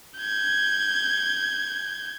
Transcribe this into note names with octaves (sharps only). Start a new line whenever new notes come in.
G6 G#6